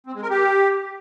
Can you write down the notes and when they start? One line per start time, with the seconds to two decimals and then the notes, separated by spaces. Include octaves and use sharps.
0.07 C4
0.14 G#3
0.22 A#4
0.30 G4